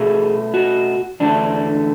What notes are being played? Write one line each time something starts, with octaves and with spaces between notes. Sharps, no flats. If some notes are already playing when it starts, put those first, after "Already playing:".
Already playing: B2 A3 G#4
F#4
E2 D3 A3 D4